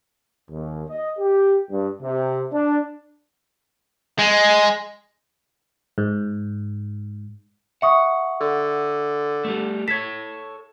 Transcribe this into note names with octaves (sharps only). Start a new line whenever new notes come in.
D#2
D#5
G4
G2
C3
D4
G#3
G#2
E5 F#5 C#6 D#6
D3
G3 A3
A4 C#5 G#6 B6